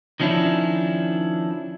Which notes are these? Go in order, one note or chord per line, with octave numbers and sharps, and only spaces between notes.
D#3 F3 C#4 D4 E4